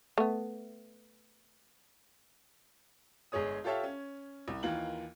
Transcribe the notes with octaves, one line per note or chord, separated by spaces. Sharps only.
A3 B3
G1 G#3 G#4 C#5 D#6
F4 G4 A4 C#5 E5 F5
C#4
C2
D#2 E3 A#3 F4 F#7